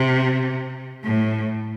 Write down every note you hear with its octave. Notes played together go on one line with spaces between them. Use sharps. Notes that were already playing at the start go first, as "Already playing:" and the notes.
Already playing: C3
A2